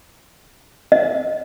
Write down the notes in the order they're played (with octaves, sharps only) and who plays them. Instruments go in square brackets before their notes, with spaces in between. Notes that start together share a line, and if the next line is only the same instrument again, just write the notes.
[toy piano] D#5